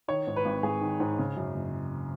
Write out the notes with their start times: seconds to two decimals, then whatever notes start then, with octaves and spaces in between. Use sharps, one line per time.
0.08 D#3 C#5
0.27 G#2
0.36 B4
0.45 G#1
0.63 G#1 G#4
0.81 D#3
1.00 G#2
1.19 C#3
1.37 F#2
1.54 F#1